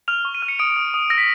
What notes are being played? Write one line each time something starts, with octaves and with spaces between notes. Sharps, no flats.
F6 F7
C#6
D#7
F6
C#7
D#6 D7
D#6
D#6
E6 A#6
B6